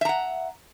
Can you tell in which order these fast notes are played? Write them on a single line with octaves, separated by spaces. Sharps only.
E5 A#5 F#5